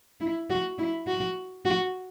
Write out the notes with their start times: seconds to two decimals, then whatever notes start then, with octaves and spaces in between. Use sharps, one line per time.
0.20 E4
0.50 F#4
0.78 E4
1.07 F#4
1.65 F#4